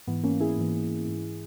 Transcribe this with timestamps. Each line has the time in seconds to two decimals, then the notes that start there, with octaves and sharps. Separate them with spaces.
0.07 G#2 E3 B3
0.23 A#3 C#4
0.40 E4 G#4
0.57 G#2 E3
1.07 G#2 E3